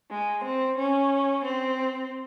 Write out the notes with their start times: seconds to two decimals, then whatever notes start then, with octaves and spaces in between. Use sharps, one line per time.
0.11 G#3
0.45 C4
0.79 C#4
1.45 C4